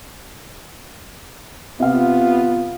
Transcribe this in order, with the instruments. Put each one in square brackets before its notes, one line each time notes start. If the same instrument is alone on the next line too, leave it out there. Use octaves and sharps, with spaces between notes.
[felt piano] C3 F5 [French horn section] B3 F4